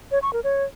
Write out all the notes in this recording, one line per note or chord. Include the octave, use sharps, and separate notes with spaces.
C#5
C#6
A#4
C#5